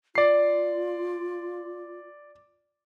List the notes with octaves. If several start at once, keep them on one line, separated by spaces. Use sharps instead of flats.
F4 D5 C7